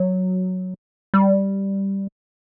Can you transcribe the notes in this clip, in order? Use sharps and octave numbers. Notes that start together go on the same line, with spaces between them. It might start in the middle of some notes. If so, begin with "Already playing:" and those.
Already playing: F#3
G3